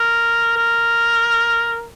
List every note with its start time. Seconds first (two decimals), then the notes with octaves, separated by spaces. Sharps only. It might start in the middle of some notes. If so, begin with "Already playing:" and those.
Already playing: A#4
0.57 A#4